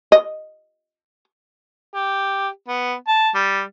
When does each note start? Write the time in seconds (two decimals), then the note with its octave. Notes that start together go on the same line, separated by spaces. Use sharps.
0.12 D#5
1.94 G4
2.69 B3
3.08 A5
3.35 G3